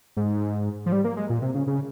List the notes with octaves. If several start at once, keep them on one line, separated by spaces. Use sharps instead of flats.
G#2
F3
G3
A#3
G#3
A#2
C3
C#3
C#3